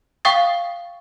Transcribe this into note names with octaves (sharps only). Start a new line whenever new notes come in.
F5 G5 C#6 D#6 A6